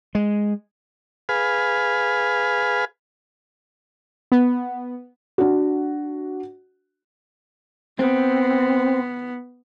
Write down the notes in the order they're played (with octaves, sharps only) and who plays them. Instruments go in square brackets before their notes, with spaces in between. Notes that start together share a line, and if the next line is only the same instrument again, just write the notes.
[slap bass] G#3
[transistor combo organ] G#4 B4 F5
[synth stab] B3
[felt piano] D4 F#4
[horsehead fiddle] B3 [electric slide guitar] C4